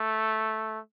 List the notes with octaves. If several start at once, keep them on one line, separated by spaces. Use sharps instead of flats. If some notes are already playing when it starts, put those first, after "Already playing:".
Already playing: A3